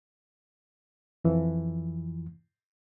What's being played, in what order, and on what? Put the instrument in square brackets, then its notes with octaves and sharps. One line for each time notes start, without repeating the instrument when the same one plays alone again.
[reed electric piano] F2 E3 F3